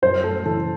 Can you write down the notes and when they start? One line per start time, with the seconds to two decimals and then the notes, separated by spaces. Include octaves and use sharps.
0.02 F#2 C5
0.24 A3 A4
0.46 E3 A4